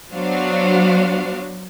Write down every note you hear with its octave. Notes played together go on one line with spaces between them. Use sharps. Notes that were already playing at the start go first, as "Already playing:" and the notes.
F#3 B3 D4 F#4 C5 F5